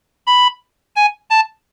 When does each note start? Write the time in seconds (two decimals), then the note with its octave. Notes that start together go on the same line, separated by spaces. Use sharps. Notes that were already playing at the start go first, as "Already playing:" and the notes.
0.27 B5
0.96 G#5
1.30 A5